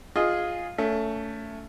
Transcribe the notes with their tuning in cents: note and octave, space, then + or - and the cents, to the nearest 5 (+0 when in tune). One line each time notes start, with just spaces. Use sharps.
F4 +10 G#4 +0 D#5 +0
A3 +10 C#4 +30